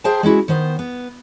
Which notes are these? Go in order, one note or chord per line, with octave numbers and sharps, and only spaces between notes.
G#4 A#4 C5 E5 G5 A5
G#3 C#4 E4 F#4
D#3 B3 C5
B3